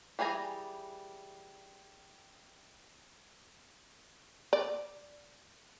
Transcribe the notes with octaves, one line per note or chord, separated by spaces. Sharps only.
E3 G3 G#4 G#5 A#5
D5